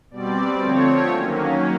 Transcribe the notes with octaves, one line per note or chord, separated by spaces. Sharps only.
B2 G3 C4 D5
D3 F3 A3 C4 C#5
D#3 F#3 A#3 C#4